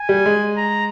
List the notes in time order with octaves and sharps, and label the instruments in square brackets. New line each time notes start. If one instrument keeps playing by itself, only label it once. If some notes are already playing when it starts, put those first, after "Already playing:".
Already playing: [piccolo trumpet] G#5
[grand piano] G3
G#3
[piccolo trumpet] A#5